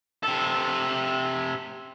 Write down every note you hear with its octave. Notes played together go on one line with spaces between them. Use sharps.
C3 A4